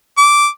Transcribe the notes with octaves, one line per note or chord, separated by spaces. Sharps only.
D6